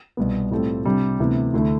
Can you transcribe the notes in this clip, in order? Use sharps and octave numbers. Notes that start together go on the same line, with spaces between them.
C2 B2 B3
A2 G3 C4 F4 A4
C3 G3 D4
D2 C3 E3 B3
D2 D3 A3 E4